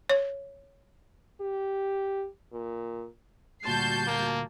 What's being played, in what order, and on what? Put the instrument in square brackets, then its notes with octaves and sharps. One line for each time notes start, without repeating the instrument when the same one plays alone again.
[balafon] C#5
[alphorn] G4
A#2
[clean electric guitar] D2 A#2 C6 [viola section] G3 F#4 A5 [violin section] G6 C7
[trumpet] A#3